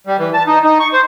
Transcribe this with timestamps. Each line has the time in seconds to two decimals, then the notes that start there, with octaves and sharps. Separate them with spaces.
0.07 G3
0.19 E3
0.34 A5
0.47 D#4
0.64 D#4
0.80 C#6
0.93 C5